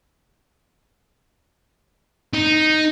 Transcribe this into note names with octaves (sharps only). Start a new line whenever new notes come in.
D#4